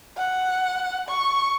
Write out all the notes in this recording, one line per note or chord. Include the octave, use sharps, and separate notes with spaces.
F#5
C#6